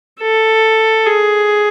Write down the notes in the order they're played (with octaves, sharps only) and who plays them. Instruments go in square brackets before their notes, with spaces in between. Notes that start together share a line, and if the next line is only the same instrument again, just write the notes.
[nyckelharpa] A4
G#4